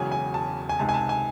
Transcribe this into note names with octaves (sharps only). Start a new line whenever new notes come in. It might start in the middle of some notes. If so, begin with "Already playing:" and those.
Already playing: E1 E2 C#3 F#3 G#5
G#5
A5
G#5
C#2 C3 D#3 A5
G#5
A5
G#5